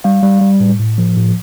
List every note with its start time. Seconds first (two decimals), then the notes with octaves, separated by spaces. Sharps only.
0.04 G3 F5
0.23 G3
0.41 G3
0.60 A2
0.79 A2
0.98 F3
1.17 A2